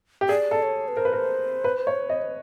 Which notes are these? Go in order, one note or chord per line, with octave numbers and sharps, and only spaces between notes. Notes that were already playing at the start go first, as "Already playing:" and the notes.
G4
G#4 D5
A4
C#5
B4
A#4 C5
B4
A#4
B4
C#5
D#5